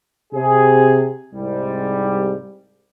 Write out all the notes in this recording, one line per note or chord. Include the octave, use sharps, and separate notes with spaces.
C3 G#4
C2 G#2 G3